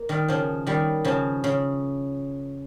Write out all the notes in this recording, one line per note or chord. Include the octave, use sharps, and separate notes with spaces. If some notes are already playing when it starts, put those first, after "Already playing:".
Already playing: A#3
D#3 G3
C#3 F3
D#3 G3
C#3 F3
C#3